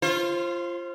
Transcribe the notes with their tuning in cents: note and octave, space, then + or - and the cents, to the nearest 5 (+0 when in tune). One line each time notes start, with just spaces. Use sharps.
F4 -20 C5 +25